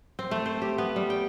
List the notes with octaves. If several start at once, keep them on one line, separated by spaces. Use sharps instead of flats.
C4
A3
C5
G4
B3
G3
G5